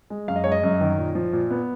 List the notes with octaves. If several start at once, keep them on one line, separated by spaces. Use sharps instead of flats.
G#3
F#2 F5
D#5
G#3 C#5
D#5
F#2
D#3
A#2
F3
A#2
B3